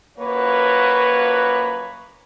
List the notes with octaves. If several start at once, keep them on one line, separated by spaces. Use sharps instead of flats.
F#2 F3 A#3 F#4 B4 C#5